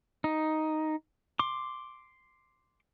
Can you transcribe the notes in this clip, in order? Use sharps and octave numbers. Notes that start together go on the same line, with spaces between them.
D#4
C6 D6